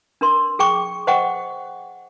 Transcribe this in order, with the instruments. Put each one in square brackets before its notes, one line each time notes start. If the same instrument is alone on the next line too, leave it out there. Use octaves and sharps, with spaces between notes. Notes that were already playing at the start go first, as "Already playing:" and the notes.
[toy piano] D4 A#4 C6
G#4 G5 C#6 D6
C5 D#5 F#5 G5 C#6